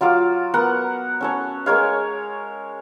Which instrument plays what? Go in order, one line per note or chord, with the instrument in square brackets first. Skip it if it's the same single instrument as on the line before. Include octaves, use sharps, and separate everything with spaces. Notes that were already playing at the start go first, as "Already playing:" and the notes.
[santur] F#3 F4 F5 D6
B3 A#4 F#5 A#5
C#4 A4 C#5
G#3 A#4 C#5 F5